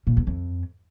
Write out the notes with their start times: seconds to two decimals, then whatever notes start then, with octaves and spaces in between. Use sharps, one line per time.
0.07 A#2
0.17 E2
0.27 F2